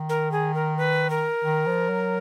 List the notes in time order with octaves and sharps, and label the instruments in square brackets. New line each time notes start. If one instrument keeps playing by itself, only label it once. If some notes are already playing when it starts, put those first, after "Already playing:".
Already playing: [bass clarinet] D#3
[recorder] A#4
G#4
A#4
B4
A#4
[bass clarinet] D#3
F3
F#3